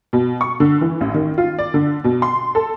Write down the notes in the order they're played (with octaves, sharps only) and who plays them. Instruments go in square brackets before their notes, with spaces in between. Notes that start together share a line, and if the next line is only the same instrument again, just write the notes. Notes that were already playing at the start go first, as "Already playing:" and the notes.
[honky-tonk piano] B2
C#6
D3
E3
A1
D#3
F4
D5
D3
B2
C6
A4